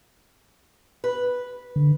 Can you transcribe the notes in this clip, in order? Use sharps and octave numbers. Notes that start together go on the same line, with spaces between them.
B4
D3